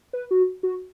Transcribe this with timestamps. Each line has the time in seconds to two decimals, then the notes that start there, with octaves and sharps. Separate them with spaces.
0.13 B4
0.31 F#4
0.63 F#4